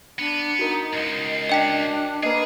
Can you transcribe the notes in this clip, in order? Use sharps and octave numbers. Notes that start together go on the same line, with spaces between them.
B3 D4
D#4 F#4 A#4
C#2 G#2 D#5
D4 D#5 G5 B6
A#3 G#4 B4 D#5